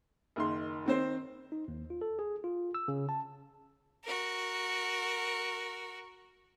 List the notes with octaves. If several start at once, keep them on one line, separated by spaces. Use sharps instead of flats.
F#1 D#3 C6
D#3 C4 C5
D#4
D#2
F4
A4
G#4
F4
E6
C#3
A5
F#4 A#4